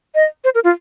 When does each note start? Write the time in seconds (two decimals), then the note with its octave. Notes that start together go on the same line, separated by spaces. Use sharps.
0.15 D#5
0.44 C5
0.55 A#4
0.64 F4